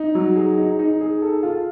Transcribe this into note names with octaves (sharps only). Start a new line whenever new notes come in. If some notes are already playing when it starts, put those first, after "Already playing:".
Already playing: D#4
F#3
G#4
D#4
D#4
G#4
A4
F4